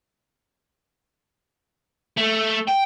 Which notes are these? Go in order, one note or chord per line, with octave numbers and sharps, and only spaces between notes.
A3
G5